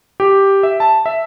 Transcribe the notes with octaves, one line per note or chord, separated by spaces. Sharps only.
G4
E5
A5
E5